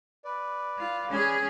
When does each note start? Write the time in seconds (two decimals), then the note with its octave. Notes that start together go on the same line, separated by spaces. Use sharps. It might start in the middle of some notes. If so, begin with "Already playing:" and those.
0.25 B4 D5
0.78 F4
1.10 C#4 G#4